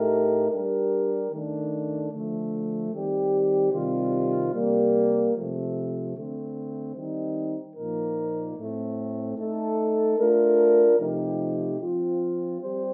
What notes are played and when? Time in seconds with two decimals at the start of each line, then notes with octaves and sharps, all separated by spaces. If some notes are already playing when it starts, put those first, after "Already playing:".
Already playing: A2 A3 D#4 G4 A#4
0.50 G3 D4 G4 A#4
1.31 D#3 A3 D4
2.11 D3 F3 A3
2.91 D#3 G3 C4 G4
3.72 C3 D#3 G3 C4 F4
4.53 C3 G3 A#3
5.34 C3 F3 A3
6.15 D3 A3 C4
6.95 D#3 G3 C4 D#4
7.76 A#2 F3 A#3 D#4 A#4
8.57 A2 A3 C4
9.38 A3 D#4 A4
10.18 A3 D4 F4 A#4
10.99 C3 F3 A3 D#4 G4
11.80 F3 C4 F4
12.60 G3 C4 G4 C5